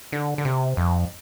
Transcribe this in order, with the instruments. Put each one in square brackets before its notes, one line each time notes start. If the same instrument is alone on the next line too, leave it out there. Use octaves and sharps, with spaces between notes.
[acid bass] D3
D3
C3
F2